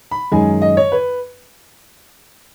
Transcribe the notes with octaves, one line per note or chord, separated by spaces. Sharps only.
B5
F#2 D#3 G#3 G#5
D#5
C#5
B4